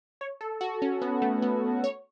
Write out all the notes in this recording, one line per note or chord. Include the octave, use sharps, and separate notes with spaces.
C#5
A4
F#4
C#4
B3
A3
B3
C#5